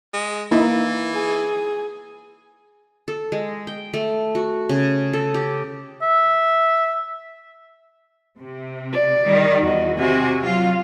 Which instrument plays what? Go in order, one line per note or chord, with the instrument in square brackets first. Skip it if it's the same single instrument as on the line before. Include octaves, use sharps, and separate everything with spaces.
[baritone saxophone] G#3
[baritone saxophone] E3 [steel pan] A#3 D#4 E4
[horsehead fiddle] G#4
[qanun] A4
G#3
G5
A3
F#4
C#3
A4
G4
[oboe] E5
[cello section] C3
[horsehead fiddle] D5
[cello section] D#3 G3
[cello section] E2 [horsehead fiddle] F#4 D#5
[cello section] C3 C4 F#4 [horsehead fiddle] G#5
[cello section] F#3 F4 [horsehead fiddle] F5